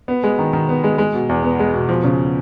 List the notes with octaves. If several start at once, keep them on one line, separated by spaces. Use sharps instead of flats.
B3
G#3
D#3
D#3
B3
G#3
G#3
B2
E2
B3
G#3
B2
F3
C#3